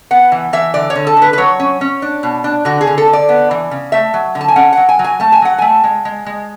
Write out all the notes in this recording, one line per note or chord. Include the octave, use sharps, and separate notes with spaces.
B3 F#5
E3
E3 E5
D3 D5
C#5
D3
A4
D3
B4
B4
F#3 C#5
C#4
C#4
D4
B2
D4
D3 F#4
G#4
D3
A4
D3
D5
B3
E3
C#3
A3 E5
F#3
D3
A5
G#5
C#4 F#5
F#3 F#5
G#5
F#3
G#5
A3 A5
G#5
F#3 F#5
A3 G#5
G#3
G#3
G#3